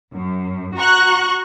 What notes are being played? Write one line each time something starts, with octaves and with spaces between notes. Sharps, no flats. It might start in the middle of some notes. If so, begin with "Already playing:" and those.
F#2
F#4 A#5 C#6 F#6